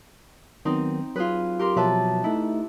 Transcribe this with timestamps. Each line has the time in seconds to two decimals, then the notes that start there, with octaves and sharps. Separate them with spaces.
0.65 D#3 F#3 B3 C4 D#4
1.16 F#3 F4 G#4 B4
1.59 G4 A#4 C6
1.77 B2 F3 F#3 B4 E5 A5
2.24 A3 D#4 E4